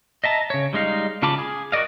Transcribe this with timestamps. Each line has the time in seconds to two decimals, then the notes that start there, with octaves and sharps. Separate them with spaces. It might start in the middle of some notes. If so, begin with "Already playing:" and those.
0.24 D#5 E5 A5 A#5
0.50 C#3 C#5
0.73 G3 G#3 D#4 F5
1.22 C#3 F4 A5 B5 D6
1.38 G#4
1.72 F#4 A#4 D5 D#5 F5